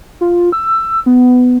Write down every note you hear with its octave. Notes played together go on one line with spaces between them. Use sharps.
F4
E6
B3